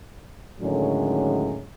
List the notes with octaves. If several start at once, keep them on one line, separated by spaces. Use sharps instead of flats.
A2 D3 D#3 F#3 G#3 C#4